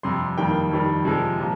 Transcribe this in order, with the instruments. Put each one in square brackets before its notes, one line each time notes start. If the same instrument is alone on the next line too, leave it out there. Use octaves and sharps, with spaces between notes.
[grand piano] F2 C3 G3 C6
F2 D#3 G3 A#3 G5
F2 D#3 G3
C3 F3 G#3
A#2 F3